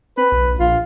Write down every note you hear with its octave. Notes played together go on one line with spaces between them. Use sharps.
C4 B4
B1
B1
A#1 F4